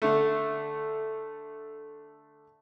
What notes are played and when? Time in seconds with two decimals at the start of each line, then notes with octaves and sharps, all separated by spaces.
0.02 D3 A3